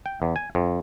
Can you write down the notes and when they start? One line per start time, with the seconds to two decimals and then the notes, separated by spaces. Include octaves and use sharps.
0.06 G5
0.22 E2
0.36 G#5
0.55 F2